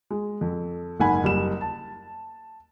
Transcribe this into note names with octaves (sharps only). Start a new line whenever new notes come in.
G#3
F2
F#1 G#2 F#5 G#5 B5
F#1 G3 E7
A5